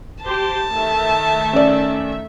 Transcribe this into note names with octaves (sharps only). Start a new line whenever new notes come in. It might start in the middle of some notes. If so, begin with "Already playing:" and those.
G4 C5 A5
D#3 A3 E5
C#4 D5